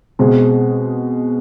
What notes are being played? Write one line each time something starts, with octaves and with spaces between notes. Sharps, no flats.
B2 G#3 C4